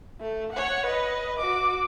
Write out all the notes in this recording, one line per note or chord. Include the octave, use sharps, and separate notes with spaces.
A3
C#5 F#5
B4 D#5
F#4 D6